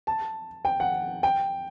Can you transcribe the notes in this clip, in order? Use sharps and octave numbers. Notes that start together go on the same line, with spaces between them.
A5
G5
F#5
G5